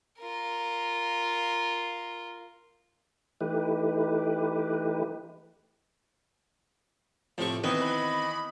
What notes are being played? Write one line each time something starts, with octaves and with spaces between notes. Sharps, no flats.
F4 A#4
E3 A3 D#4 G4 B4
A2 C3 F3 C#6
D#3 E3 B3 C4 B4 D#5
B5